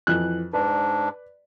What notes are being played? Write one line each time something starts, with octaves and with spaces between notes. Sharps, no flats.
F2 E3 F#6
G#2 D4 B4 D5